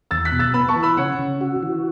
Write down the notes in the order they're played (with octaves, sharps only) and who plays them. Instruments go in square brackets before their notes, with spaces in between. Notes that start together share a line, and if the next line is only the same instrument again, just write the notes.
[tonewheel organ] E2 [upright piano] E6 A6
[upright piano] F#6 B6
[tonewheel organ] B2
[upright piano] E6 A6
[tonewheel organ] B3 [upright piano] B5 E6
[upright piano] A5 C#6
[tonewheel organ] E3
[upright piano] B5 E6
[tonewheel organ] C#3 [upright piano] C#5 F#5
[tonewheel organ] C#3
F#4
E3